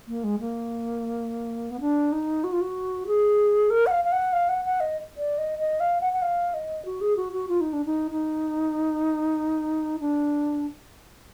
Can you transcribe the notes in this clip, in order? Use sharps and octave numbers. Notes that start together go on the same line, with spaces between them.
A#3
G#3
A#3
B3
D4
D#4
F#4
F4
F#4
G#4
A#4
F#5
F5
F5
F#5
F5
F#5
F#5
D#5
D5
D#5
D#5
F5
F#5
F#5
F5
D#5
F#4
G#4
F#4
F#4
F4
D#4
D4
D#4
D#4
D4